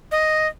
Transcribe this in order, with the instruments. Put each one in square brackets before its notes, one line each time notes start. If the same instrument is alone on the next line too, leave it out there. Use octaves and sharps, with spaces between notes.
[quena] D#5